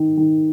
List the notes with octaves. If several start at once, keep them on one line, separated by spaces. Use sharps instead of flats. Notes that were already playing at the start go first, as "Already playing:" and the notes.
Already playing: D#3
D#3